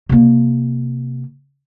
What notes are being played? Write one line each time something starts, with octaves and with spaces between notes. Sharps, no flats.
C3 A#3